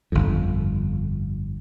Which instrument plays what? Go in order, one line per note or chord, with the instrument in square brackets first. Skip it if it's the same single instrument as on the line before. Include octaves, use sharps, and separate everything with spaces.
[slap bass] G1 F2